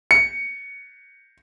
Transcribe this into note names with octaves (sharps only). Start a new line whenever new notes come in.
C#7